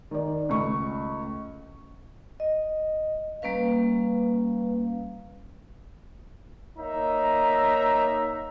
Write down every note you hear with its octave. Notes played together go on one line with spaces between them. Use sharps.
D#3 D5
C#2 A3 C#6
D#5
G3 A#3 C#4 B4 F5
A#3 D#4 C#5 E5 A#5